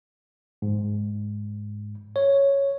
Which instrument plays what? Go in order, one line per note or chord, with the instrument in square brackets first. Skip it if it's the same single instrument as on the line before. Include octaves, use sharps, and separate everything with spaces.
[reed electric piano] G#2
[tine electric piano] C#5